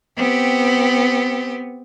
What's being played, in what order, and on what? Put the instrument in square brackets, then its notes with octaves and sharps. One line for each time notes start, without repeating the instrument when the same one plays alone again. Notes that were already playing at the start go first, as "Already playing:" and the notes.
[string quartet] B3 C4 G4